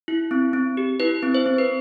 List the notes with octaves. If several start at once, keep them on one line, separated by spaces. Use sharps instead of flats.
E4
C4
C4
G4
E4 B4
C4
C5
C4
B4